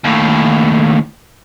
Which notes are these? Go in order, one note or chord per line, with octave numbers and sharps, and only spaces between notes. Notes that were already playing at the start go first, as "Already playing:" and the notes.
D#2 A2